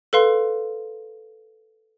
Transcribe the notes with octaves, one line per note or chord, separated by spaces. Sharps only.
A4 B4 F5 C6